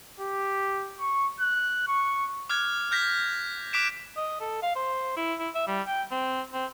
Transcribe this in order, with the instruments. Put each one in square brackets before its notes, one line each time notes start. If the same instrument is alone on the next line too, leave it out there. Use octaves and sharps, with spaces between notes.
[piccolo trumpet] G4
C#6
F#6
C#6
[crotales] D6 F6 F#6 G#6
F6 G6 A#6 B6
D6 F#6 B6 D7 E7
[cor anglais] D#5
A4
F5
C5
E4
E4
E5
G3
G5
C4
C4